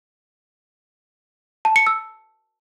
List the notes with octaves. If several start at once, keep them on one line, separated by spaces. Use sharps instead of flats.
A5
C#7
E6